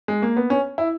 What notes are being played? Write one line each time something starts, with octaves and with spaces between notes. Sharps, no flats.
G#3
A#3
B3
C#4
E4